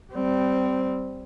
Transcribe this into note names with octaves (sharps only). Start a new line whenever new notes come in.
G3 C4